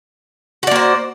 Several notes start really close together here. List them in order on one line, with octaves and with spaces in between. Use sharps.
F#4 D5 A#3 C5